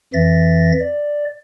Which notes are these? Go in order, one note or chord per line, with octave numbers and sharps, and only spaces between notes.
F2 E3 E5 A6 A#6
D5